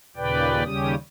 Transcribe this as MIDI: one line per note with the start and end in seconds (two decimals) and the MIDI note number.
0.16 0.63 39
0.16 0.63 46
0.16 0.63 49
0.16 0.63 71
0.16 0.63 74
0.16 0.63 79
0.64 0.95 39
0.64 0.95 49
0.64 0.95 55
0.64 0.95 61
0.64 0.95 67
0.64 0.95 87